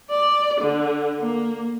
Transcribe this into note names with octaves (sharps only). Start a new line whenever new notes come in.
D5
D3
A#3